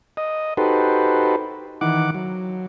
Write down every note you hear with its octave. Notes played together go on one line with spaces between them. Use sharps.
D#5
D#4 F#4 G4 A4 B4 C5
D#3 E3 F#5 D6
F#3